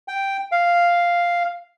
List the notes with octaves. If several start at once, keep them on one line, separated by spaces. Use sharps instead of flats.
G5
F5